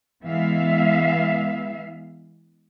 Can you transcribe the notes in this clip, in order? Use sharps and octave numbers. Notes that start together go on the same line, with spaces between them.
E3 G#3 B3 E5 F5